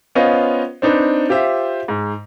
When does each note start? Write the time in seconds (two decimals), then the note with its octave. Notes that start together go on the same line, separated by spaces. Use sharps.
0.15 B3 C#4 F4 C5 D#5
0.82 C4 D4 D#4 B4
1.29 F4 G4 C5 E5
1.88 G#2